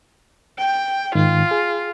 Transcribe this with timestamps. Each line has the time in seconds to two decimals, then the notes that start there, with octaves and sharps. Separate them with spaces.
0.58 G5
1.15 G#2 D#3 F4
1.51 G#4